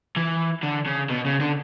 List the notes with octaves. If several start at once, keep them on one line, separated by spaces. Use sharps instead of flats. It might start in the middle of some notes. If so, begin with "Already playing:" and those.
E3
D3
C#3
B2
C#3
D3